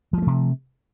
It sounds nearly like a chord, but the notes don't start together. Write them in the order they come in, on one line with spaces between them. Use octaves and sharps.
F3 G#3 A3 C3